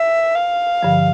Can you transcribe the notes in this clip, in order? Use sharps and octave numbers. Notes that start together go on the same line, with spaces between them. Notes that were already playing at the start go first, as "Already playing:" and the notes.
Already playing: E5
F5
G2 D3 F3